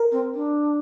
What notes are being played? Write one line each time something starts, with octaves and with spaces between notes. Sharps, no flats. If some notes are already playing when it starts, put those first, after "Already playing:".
Already playing: A#4
C4
D4